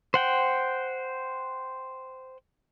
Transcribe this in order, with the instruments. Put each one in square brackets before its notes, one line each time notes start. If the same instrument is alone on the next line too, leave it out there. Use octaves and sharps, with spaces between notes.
[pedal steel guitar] C5 F#5 G5